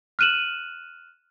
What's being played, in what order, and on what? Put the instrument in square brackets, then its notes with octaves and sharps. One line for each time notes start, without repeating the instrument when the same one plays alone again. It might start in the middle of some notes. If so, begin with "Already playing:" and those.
[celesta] F6 F#6 D#7 E7 F#7